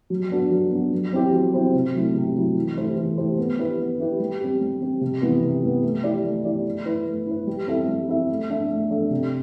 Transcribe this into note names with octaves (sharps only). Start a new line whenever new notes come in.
F#3
B3 D4 F#4
F#3
B3 D4 F#4
F#3
C4 E4 G4 C5
F#3
C4 E4 G4 C5
C3
F#3 A3 E4
C3
F#3 A3 E4
E3
A3 E4 G4 C5
E3
A3 E4 G4 C5
B3
E4 G4 B4
B3
E4 G4 B4
G3
C4 G4
G3
C4 G4
C3
E3 G3 B3
C3
E3 G3 B3
A3
E4 G4 D5
A3
E4 G4 D5
A3
E4 B4
A3
E4 B4
G3
C4 E4 A4 E5
G3
C4 E4 A4 E5
A3
D4 A4 E5
A3
D4 A4 E5
C3